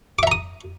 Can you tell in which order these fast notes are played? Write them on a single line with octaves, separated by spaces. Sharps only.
D6 E5 A#5 D#6